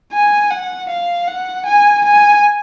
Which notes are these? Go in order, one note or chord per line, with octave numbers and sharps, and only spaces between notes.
G#5
F#5
F5
F#5
G#5
G#5